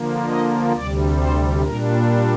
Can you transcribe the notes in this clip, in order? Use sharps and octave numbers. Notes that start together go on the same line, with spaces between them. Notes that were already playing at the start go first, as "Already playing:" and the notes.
Already playing: D3 F3 A#3
D#5
D2 C3 G3 D5
C5
A#2 G3 D4 A#4